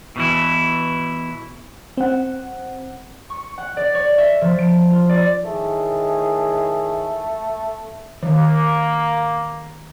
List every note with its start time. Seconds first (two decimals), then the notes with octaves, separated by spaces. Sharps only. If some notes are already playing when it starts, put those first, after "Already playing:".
0.16 B2 E3 E4
1.97 C4 F#5
3.30 C#6
3.58 F#5
3.77 D5
3.94 C#5
4.18 E5
4.41 F3
4.59 D7
4.91 F4
5.09 D5
5.45 A2 D#3 A3 G#4
8.23 D#3 A#3